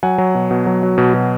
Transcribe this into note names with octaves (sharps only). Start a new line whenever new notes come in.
F#3 F#5 G#5
F#3
B2
B2
F#3
F#3
B2
B2